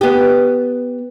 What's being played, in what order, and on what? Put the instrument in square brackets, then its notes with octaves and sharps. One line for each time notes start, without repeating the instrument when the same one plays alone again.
[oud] B3 G4